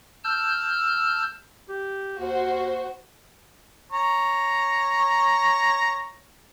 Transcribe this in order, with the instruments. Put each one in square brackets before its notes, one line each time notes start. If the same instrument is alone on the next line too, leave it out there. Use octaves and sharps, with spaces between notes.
[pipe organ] A5 E6 F6 G6
[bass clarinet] G4
[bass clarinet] D#2 [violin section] F#4 C5
[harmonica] C#5 A#5